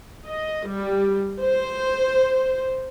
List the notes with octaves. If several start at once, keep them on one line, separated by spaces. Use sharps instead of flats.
D#5
G3
C5